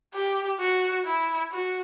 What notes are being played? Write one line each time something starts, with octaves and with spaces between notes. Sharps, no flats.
G4
F#4
E4
F#4